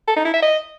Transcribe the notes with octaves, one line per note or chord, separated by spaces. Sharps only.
A4
D#4
E4
E5
D#5